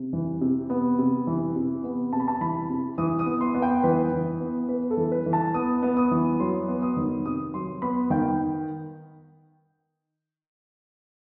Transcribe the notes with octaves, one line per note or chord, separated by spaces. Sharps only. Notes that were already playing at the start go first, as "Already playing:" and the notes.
Already playing: C3
E3
C3
B3
C3
E3
C3
B3
C3 A5
B5
A5
E3 B5
C3
E3 D#6
D#6
B3
C6
B3
G5
E3 B4
E3
B3
B3 B4
A4
E3
B4
E3
A5
B3 D#6
B3
D#6
E3
F#3 C6
B3
D#6
D#3
C3 D#6
F#3 C6
B3 B5
D#3 G5